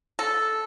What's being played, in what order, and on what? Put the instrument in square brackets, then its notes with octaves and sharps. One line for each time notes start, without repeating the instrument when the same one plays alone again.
[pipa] A4